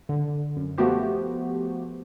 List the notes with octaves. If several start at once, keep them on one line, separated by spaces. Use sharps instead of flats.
D3
F#2
F3 A3 B3 F#4 G4 C5